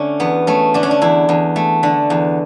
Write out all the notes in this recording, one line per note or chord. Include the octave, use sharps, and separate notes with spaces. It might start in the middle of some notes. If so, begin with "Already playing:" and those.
Already playing: D3 A3 C#4
E2 B3
A3 C#4
D3 D4
C#4
D4
E2 E4
E2
A3
D3
E2